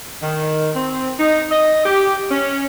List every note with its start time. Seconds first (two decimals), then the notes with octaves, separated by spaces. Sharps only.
0.23 D#3
0.76 C4
1.19 D#4
1.51 D#5
1.85 G4
2.30 C#4